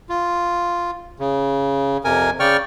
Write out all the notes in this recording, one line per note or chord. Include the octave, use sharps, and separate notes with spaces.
F4
C#3
F2 C3 A#4 G#5
C#3 D5 G5 C#6 F6